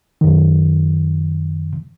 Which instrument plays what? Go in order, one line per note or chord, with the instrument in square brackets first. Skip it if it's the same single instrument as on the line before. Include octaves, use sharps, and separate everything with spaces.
[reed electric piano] F#2 D#3